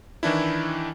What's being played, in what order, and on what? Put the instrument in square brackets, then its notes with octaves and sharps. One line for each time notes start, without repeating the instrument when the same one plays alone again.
[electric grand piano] D#3 E3 D4 E4